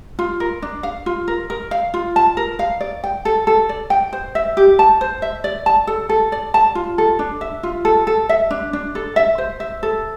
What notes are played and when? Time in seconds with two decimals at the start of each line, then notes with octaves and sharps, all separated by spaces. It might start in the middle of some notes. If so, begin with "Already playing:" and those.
0.19 F4
0.40 A#4
0.62 D4
0.83 F5
1.06 F4
1.28 A#4
1.50 A#4
1.71 F5
1.94 F4
2.16 A5
2.37 A#4
2.59 F5
2.81 D5
3.04 G5
3.25 A4
3.47 A4
3.69 D5
3.90 G5
4.13 C5
4.35 E5
4.57 G4
4.79 A5
5.01 C5
5.22 E5
5.44 D5
5.66 A5
5.87 A4
6.09 A4
6.32 D5
6.54 A5
6.75 F4
6.98 A4
7.19 D4
7.41 E5
7.63 F4
7.85 A4
8.07 A4
8.29 E5
8.51 D4
8.73 D4
8.95 A4
9.16 E5
9.38 C5
9.60 E5
9.83 A4